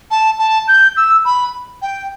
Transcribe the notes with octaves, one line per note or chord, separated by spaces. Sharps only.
A5
A5
G6
E6
B5
G5